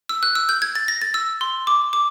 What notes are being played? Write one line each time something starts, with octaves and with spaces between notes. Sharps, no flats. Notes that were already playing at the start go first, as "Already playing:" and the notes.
E6
F#6
E6
G6
G#6
A6
A#6
A6
E6
C6
D6
D6